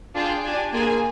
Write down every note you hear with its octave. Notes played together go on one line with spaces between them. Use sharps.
D4 F4 G#4 G5
D4 G4 G#5
A#3 D4 F4 G#4 G#5